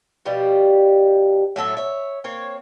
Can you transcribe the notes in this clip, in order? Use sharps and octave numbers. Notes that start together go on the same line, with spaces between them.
B2 F3 G3 G4
A2 F#3 A4 E5
C#5 E5
A#3 C4 C#5